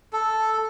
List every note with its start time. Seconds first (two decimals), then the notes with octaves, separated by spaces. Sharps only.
0.13 A4